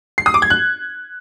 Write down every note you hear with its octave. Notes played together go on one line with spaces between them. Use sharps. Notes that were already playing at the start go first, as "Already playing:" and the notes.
C7
D#6
D6
G#6
F#6